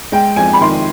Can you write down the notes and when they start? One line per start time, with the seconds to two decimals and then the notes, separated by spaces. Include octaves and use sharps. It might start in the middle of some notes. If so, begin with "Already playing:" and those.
0.12 G#3 G5
0.36 F2 G#5
0.53 B5
0.61 D#3 C6